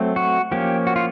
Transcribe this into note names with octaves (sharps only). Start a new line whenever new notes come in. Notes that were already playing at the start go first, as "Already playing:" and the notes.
Already playing: F#3 A3 C4
F#4
F3 A#3 C#4 G4
F#4
F4